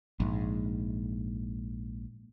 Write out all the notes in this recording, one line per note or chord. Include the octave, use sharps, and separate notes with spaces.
A#1 G#2